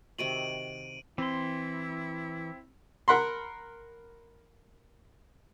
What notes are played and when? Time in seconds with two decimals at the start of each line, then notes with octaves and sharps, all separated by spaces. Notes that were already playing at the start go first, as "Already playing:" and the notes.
0.18 C3 D#3 F#4 D7 D#7 F#7
1.18 E3 C4 E4 C6
3.08 A#4 F#5 B5 C6